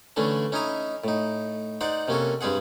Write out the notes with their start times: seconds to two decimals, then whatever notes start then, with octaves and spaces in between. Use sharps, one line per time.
0.16 D3 E3 A3 C#4 D4
0.52 C#4 D#4 E4 D#5 A#5
1.04 A2 D#4
1.81 D#4 C5 D5 F#5
2.08 C3 A#3 C#4 F#4 A4
2.41 G2 G3 C4 G#4 F#5